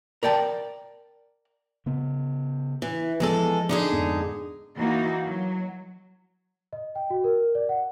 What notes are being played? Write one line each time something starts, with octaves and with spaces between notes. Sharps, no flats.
A#4 D5 G5 A5
C#3 B3
E3
E2 F3 G#3 A4
D3 D#4 G#4
F2 G#2 B3
E3 A#3 D#4 E4 F#4
F#3
D#5
G5
F#4
A#4
D5
F#5